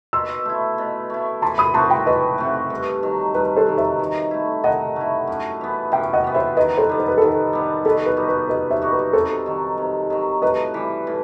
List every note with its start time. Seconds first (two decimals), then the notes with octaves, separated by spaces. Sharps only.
0.13 B2 C6 E6
0.45 A3 E4
0.78 B2
1.10 A3 E4
1.42 E3 A5 C6
1.58 B5 D#6
1.74 A3 C4 F#4 A5 C6
1.90 G5 B5
2.06 E3 B4 D#5
2.38 A3 C4 F#4
2.70 G2
3.03 D#3 F#3
3.35 G2 B4
3.56 A4 C5
3.67 D#3 F#3
3.78 C5 E5
3.99 D#3
4.31 A3 E4
4.63 D#3 D#5 F#5
4.96 A3 E4
5.27 F#2
5.61 E3 B3
5.92 F#2 E5 G5
6.13 D#5 F#5
6.24 E3 B3
6.35 C5 E5
6.57 D#3 B4 D#5
6.77 A4 C5
6.89 G3 B3
6.99 C5
7.08 B4
7.18 A4
7.22 D#3 B4
7.53 G3 B3
7.85 B2 A4
8.06 B4
8.17 G3 D#4 F#4
8.28 B4
8.49 B2 B4 D#5
8.70 C5 E5
8.81 G3 D#4 F#4
8.92 B4
9.13 C3 A4 C5
9.46 D#3 F#3
9.78 C3
10.10 D#3 F#3
10.42 A2 B4 D#5
10.74 E3 G3
11.07 A2